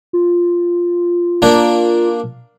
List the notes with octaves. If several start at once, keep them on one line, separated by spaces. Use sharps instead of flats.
F4
A#3 D4